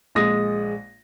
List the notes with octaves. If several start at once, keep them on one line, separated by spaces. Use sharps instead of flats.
A#1 G#3 D#6 A#6